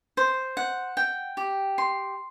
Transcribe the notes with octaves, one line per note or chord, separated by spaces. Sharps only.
C5
F#5
G5
G4
C6